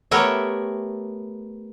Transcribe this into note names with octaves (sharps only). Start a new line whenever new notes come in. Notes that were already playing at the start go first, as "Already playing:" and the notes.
A3 B3 G4 A#4 C#5 E5